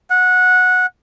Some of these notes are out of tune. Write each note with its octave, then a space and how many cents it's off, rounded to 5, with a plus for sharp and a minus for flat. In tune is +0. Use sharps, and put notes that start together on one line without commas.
F#5 -15